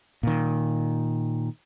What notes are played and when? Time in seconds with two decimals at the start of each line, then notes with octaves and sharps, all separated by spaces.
0.23 A#2 D#3